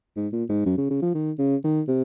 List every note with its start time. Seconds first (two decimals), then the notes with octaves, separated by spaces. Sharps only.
0.16 G#2
0.33 A#2
0.49 G#2
0.66 F#2
0.78 C#3
0.90 C#3
1.02 F3
1.14 D#3
1.39 C#3
1.64 D#3
1.88 C3